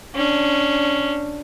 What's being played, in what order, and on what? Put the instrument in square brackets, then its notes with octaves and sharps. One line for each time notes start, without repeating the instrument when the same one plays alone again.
[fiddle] C#4 D4